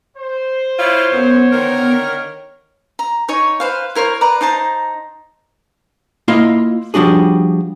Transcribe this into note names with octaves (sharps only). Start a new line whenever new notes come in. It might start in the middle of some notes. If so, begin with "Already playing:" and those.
C5
E4 F4 C#5
F#2 B3
D3 D#3 A#4
A#5
D#4 C#5 G#5 C#6
B4 C5 F5
E4 A#4 C5 C#5
B4 D5 A#5
D#4 C5 A5 A#5
A#3 E4 F4 D#5 F5
F3 G3 D4 F#4 G#4